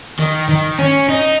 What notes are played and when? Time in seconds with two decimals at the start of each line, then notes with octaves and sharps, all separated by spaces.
0.19 D#3
0.49 D#3
0.79 C#4
1.09 D#4